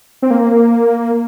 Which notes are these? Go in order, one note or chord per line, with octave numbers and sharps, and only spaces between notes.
C4
A#3